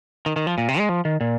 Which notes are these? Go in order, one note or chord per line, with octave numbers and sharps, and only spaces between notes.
D#3
D#3
F3
A#2
C3
G#3
F3
D#3
A#2